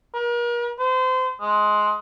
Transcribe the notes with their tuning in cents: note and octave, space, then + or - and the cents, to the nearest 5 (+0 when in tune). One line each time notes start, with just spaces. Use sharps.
A#4 +40
C5 -30
G#3 +15